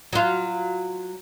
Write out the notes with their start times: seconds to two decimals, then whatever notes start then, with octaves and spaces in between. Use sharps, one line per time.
0.13 F#3 F4